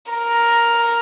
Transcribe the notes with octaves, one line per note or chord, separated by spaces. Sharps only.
A#4